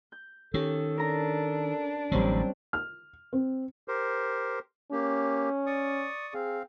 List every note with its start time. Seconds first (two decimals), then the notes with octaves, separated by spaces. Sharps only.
0.12 G6
0.54 D#3 C#4 G4 A4
0.98 D4 A#4 A#5
2.12 A1 D3 F#3 G3 C4 C#4
2.73 F6
3.33 C4
3.88 G4 A#4 C5
4.92 A#3 C#4 G4
5.66 D5 C#6 D#6
6.34 C4 G#4 F5